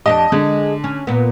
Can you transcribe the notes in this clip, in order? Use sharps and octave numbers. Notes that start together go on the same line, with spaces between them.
F2 D4 G4 D#5
D3 G#3
C#4
A#2 B3